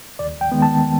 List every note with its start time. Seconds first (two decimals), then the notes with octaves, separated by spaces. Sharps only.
0.19 D#2 D5
0.41 G5
0.52 D#3 G#3 B3
0.62 A5